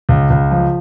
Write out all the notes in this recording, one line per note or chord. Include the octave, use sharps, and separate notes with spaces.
C#2
C#2
F3